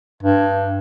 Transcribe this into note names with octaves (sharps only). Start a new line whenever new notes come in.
G2